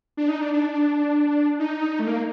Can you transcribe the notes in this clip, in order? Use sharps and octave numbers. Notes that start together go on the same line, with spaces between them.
D4
D#4
D4
D4
D#4
A3
A#3